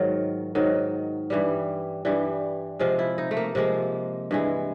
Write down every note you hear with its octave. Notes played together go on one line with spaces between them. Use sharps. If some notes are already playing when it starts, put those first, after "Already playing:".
Already playing: G#2 D#3 F#3 F4
G#2 D#3 F#3
G2 E3 G3
G2 E3 G3
C3 F3 G#3 F4
E4
D#4
A3
A#3
C3 F3 G#3 A#3
G2 E3 G#3